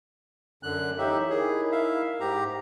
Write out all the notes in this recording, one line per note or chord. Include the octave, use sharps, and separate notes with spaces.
F#2 D3 F#6
E3 D#4 G4 C#5 E5
D#4 E4 G#4 A#4
E5 F5
G#2 G4 A#5